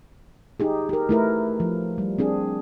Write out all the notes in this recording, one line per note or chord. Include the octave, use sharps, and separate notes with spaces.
D#4 G4 G#4
G4 A#4
A3 E4 A#4 B4
F3
G3
C4 D4 G#4